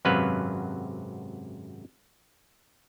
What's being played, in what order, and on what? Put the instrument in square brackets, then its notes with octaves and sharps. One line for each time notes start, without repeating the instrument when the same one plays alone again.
[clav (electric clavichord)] G#1 F#2 C3 F#3 B4 F5